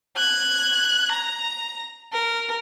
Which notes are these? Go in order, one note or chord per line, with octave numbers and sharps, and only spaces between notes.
F#6 G#6
A#5
A#4